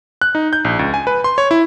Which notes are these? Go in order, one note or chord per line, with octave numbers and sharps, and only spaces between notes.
F#6
D#4
G6
A#1
C#2
G#5
B4
C6
C#5
E4